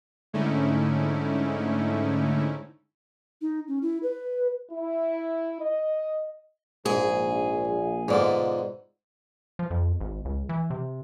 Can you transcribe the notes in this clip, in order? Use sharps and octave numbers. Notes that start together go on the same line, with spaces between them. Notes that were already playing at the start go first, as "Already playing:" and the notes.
G#2 D3 A3 C#4 D#4 E4
D#4
C#4
E4
B4
E4
D#5
A#1 G#2 G#4
G#2 B2 D3 F4 D5
F3
F2
G#1
C#2
E3
C3